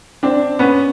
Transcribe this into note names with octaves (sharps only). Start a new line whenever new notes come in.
C4 D4
B3 C#4